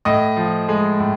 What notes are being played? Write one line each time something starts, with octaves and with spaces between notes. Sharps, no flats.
A2 D#5
F3
G#3
A2